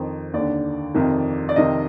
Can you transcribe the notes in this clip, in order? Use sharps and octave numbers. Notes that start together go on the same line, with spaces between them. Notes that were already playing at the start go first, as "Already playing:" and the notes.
Already playing: F2 D#3 C5
D#2 D3 D5
F2 C3 D#3
D5
F2 C3 D#3 D#5